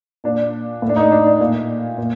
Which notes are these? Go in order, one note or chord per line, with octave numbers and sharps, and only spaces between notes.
A#2 D4
A2
D4
D#4
D4
D4
A#2
A#2